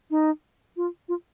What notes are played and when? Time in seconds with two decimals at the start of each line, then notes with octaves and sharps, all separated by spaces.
0.11 D#4
0.77 F4
1.09 F4